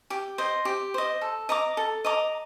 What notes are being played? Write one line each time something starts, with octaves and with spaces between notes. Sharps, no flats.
G4
C5 D#5
G4
C5 D#5
A4
D#5 A#5 D6
A4
D#5 A#5 D6